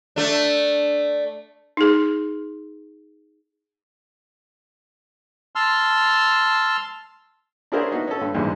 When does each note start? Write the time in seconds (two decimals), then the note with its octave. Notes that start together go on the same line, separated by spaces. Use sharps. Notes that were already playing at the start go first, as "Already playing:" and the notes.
0.16 A3 D4
1.77 D#4 G#4
5.55 A5 C6 E6 F6
7.72 D4 E4 F#4 G#4 A#4 C5
7.91 B3 D#4 F#4
8.07 C#4 A4
8.21 G2
8.34 A#1 E2 G#2 D3 G3 G#3